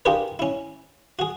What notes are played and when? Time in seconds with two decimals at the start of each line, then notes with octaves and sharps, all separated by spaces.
0.05 D4 F4 G4 G#4 A#4 B4
0.39 C#4 E4
1.19 F#4 G#4